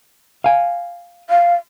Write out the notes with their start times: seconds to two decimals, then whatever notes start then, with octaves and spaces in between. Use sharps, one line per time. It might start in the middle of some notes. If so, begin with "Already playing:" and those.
0.44 F5 G#5
1.30 F5